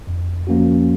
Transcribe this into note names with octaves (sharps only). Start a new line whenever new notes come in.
F2
F3 A#3 C#4 F#4